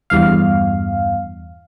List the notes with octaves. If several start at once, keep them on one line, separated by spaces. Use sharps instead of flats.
E2 G2 F5